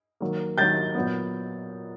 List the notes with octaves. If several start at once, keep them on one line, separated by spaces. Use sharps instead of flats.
D#3 F#3 A#3
D#3 F#3 A#3 G6 A6
A#2 F#3 B3